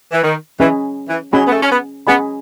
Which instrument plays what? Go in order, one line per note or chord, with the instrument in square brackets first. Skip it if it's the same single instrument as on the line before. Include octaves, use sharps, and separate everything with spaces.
[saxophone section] E3
D#3
[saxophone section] E3 [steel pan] C#4 G#4 D#5 G#5 B5
[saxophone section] E3
[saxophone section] F#3 [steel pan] C#4 G#4 D#5 G#5 B5
[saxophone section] B3
A3
C#4
B3
[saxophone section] B3 [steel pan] C#4 G#4 D#5 G#5 B5